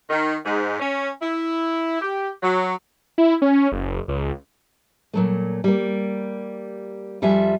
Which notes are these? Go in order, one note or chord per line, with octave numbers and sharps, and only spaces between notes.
D#3
G#2
C#4
E4
G4
F#3
E4
C#4
F#1
C#2
A#2 F#3 A3
G3 A#3
F2 G3 F4 F#4 E5 G#5